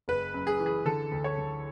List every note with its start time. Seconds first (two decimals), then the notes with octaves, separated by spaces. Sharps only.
0.08 F#1 B4
0.34 F#2
0.47 G#4
0.60 E3
0.66 G#4
0.85 D3 A4
1.11 D2
1.24 C#5
1.38 D2